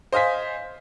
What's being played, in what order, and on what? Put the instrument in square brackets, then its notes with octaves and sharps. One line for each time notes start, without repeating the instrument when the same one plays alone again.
[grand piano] C5 D#5 F5 G#5 B6